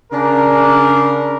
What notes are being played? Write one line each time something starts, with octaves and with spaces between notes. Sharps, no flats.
C#3 D4 A#4